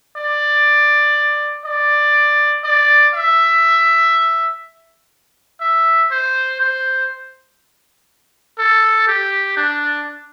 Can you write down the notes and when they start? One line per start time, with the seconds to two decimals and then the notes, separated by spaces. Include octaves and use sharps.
0.17 D5
1.65 D5
2.64 D5
3.14 E5
5.61 E5
6.11 C5
6.60 C5
8.59 A4
9.07 G4
9.57 D4